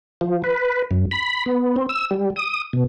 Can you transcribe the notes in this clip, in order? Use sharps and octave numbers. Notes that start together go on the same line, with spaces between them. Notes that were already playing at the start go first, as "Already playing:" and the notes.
F3
B4
F#2
B5
B3
C4
E6
G3
D#6
B2